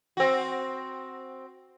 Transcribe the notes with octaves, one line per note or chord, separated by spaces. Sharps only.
C4 F#4